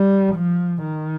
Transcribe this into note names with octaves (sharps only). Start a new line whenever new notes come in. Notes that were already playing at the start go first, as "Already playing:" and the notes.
Already playing: G3
F3
D#3